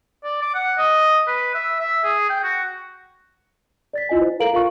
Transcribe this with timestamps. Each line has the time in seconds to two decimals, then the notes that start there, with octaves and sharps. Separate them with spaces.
0.24 D5
0.42 D6
0.54 F#5
0.78 D#5
1.27 B4
1.55 E5
1.80 E5
2.04 G#4
2.30 G5
2.43 F#4
3.93 D5 A6 B6
4.09 E4 F4 D#5 G#5
4.21 C5
4.40 A4 A#4 F5 A#5 D7 F#7
4.53 F4 F5 C#6